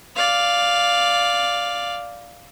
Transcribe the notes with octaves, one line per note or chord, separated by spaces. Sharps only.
D5 F5